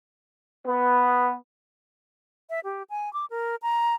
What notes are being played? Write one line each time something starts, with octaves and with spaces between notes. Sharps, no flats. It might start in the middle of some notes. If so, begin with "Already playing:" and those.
B3
E5
G4
G#5
D6
A#4
A#5